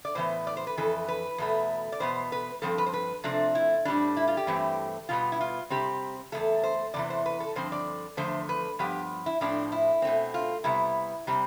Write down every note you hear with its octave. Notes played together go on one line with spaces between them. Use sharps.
D5
A2 E3 B3 C5
D5
C5
B4
F2 E3 A4
B4
E2 B2 A3
D5
E2 B2 B3 C5
B4
G2 F3 C4 A4
B4
C5
B4
C3 F3 A3 C4 D4
E4
A2 G3 C4 D4
E4
F4
G4
G2 E3 A3 C4
B2 G3 B3 F4
E4
F4
C3 G3 C4 G4
E2 B2 A3 A4
C5
E2 C3 E3 D5
C5
B4
A4
G2 D3 F3 C4 C5
D5
E2 D3 F3 A3 C5
B4
G2 F3 B3 G4
E4
A2 F3 C4 D4
E4
B2 A3 C4
F4
C3 G3 B3 E4
C3 G3 C4